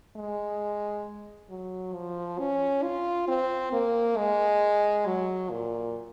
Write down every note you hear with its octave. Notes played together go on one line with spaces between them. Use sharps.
G#3
F#3
F3
C#4
F4
C4
A#3
G#3
F#3
A#2